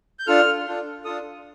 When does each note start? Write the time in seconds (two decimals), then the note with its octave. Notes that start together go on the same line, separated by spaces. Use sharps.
0.19 G6
0.27 D4 F4 A4 F6
0.66 D4 F4 A4
1.04 D4 F4 A4 D#6